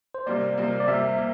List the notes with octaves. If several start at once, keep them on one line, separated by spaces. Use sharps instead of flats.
C5
C3 G3 A#3 D5
C3 G3 A#3
D5
C3 G3 A#3 E5
A#3